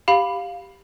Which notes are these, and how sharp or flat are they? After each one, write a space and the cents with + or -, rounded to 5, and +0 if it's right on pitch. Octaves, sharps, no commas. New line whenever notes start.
G4 +0 F5 +10 B5 +0